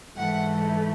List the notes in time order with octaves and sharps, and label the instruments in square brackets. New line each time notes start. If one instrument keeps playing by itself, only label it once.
[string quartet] G#2 E3 A3 F#5